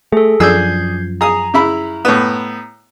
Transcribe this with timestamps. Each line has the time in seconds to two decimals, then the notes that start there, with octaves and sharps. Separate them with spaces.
0.12 A3 G#4 A4
0.40 F#2 F3 D4 G#4 E6 G6 G#6 C7
1.21 G#4 A#5 D#6
1.54 C#3 E4 B5
2.05 A2 B3